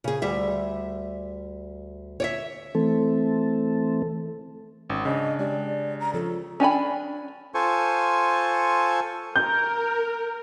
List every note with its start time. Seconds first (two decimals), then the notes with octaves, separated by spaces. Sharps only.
0.04 C#3 G#4
0.22 D2 G3 E5
2.20 C#5 D5 E5
2.75 E3 A3 C4 A4
4.90 G#1 C#4
5.05 C#3 D4 D#5
5.39 G#3 G4 D5
6.00 A#5
6.14 F3 C4 A4 C#5
6.60 C#4 D4 G#5 B5
7.55 F4 A4 C5 G#5 C#6
9.36 A#4 G6